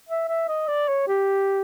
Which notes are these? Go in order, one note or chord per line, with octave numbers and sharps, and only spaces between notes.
E5
E5
D#5
D5
C#5
G4